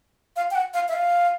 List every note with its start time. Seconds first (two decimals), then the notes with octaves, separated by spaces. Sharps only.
0.36 F5
0.51 G5
0.55 F#5
0.74 F5
0.88 E5
0.93 F5